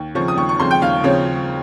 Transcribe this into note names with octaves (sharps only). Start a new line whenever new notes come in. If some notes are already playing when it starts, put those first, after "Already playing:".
Already playing: D#2
C#3 F3 C4 C#6
D#6
D#2 C#6
C#6
C#3 F3 C4 C6
G5
D#2 F5
C#3 F3 C4 C#5